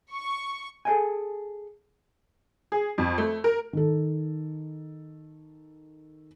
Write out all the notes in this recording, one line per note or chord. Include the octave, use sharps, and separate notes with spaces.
C#6
G#4 A4 B4 D#5 G5 G#5
G#4
F2
A3
A#4
D#3 A4